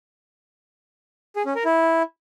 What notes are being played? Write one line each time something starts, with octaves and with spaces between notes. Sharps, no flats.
G#4
C#4
A#4
E4